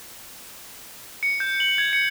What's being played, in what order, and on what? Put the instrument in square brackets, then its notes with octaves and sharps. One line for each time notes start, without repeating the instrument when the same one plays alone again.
[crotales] C#7
G6
F#7
G#6
C#7